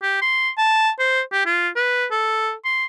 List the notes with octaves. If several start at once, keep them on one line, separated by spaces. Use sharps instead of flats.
G4
C6
A5
C5
G4
F4
B4
A4
C6